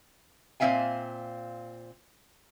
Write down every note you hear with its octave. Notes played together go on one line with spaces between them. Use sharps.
A#2 C4 C#4 E5 F5 G#5